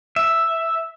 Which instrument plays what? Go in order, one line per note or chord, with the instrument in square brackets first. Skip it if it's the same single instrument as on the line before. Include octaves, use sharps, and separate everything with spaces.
[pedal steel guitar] E5